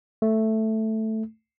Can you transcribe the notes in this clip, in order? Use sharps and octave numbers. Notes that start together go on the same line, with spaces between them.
A3